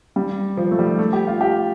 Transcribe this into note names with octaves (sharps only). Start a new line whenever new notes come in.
G3
F3
A3
G3
A3
G4
F4
G4